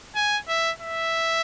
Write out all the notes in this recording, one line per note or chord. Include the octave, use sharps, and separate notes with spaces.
G#5
E5
E5